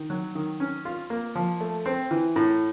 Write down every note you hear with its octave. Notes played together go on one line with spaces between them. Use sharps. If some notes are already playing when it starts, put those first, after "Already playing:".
Already playing: D#3
F#3
D#3
C#4
F4
A#3
F3
A3
C4
E3
A2